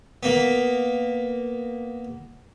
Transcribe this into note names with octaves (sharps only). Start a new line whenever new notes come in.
A#3 B3